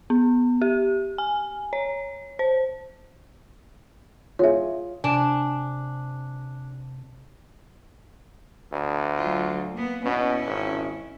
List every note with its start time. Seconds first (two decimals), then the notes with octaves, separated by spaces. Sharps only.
0.10 B3
0.62 G4
1.18 G#5
1.73 C#5
2.39 C5
4.39 F4 G#4 C#5 E5
5.04 C3 D4 G#5
8.72 D2
9.18 F#3 F4
9.73 A#3 B3
10.06 B2 C#4 E4
10.47 G#1